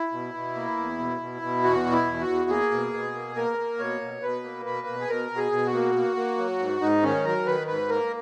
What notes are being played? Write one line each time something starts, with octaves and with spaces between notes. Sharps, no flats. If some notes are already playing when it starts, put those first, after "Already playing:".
Already playing: E4
B2
B2
A#3
E2
B2
B2
B2
E2 F#4
B2
E4
E2
F#4
E2
A#3 G#4
B2
B2
A#3
A#3 A#4
A#3
B2 C#5
B2
B2 B4
A#3
B2 B4
B2
G#4
B2 A#4
B2
G#4
B2
F#4
A#3
A#3
A#3
F#3
G#2
G#2 D#4
D#3 C#4
F#3 A#4
D#3 B4
G#2 B4
A#3 A#4